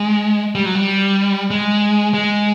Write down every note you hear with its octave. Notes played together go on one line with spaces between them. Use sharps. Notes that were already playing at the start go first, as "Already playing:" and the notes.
Already playing: G#3
G3
F#3
G3
G#3
G#3